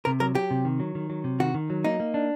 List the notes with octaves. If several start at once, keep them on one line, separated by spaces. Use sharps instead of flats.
C3 A#4
F#3 A#4
F#3 G4
C3
D#3
F#3
D#3
F#3
C3
D#3 F#4
D#3
F#3
A#3 D#4
A#3
D4